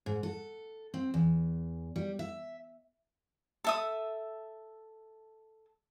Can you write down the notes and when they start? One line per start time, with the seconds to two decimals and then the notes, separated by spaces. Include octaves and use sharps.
0.06 G#2
0.23 A4
0.94 C4
1.14 E2
1.96 G3
2.19 E5
3.64 A4 E5 D#6